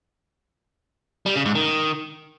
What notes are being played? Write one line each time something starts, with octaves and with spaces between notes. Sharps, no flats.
G3
C#3
G#2
D#3